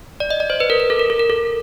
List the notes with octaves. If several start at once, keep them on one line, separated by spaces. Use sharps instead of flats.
D5
D#5
D5
C5
B4
A#4
A#4
A4
A#4
A4
A#4
A4